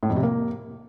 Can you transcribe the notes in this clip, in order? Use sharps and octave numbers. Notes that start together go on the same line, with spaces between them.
A2
F2
C3
A#3